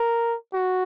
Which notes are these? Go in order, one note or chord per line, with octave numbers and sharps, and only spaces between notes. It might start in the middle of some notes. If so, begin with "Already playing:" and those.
Already playing: A#4
F#4